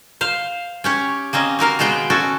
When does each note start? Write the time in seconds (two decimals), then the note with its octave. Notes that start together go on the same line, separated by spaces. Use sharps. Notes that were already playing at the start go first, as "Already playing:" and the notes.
0.21 C5 F5
0.84 C#4 G4 C#5
1.33 A#3 C4 C#4 D#5
1.59 C4 F#4 A#4 F5
1.79 B2 G#3 B3 C5 G5
2.10 C#4 F#4 A4